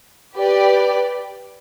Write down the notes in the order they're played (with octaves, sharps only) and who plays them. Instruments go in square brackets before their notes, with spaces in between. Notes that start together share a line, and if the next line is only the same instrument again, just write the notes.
[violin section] G4 B4 D5